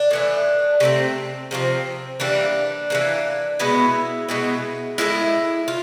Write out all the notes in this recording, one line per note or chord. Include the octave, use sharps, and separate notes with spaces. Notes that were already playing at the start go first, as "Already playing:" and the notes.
Already playing: D4
A2 E3 A3
C3 F3 A3 C4 C#4
C3 F3 A3 C4
E3 G3 A#3 D4
E3 G3 A#3
B2 G#3 B3 E4
B2 G#3 B3
A2 E3 G#3 E4
F4